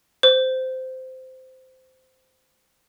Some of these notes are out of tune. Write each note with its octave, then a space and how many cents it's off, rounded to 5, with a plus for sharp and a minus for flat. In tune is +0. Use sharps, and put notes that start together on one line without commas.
C5 -15